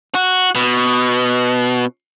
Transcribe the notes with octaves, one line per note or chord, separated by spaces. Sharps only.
F#4
B2